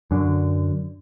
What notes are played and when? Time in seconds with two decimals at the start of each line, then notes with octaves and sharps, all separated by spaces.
0.11 F#2 D3